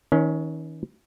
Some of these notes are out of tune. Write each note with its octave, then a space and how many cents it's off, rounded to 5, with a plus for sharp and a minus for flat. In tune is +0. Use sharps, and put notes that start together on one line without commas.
D#3 +40 C#4 +15 C#5 -35